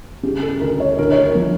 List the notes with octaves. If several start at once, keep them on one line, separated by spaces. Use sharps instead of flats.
C#3 G4
A4
D2 A#4
C#5
D2 A#4
C#5
A#4
F3